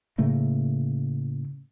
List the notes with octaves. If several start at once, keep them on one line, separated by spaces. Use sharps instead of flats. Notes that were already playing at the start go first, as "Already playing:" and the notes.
A2 C#3 A3 A#3